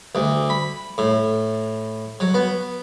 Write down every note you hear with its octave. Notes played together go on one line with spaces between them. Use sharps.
D2
B5
A2
F#3
B3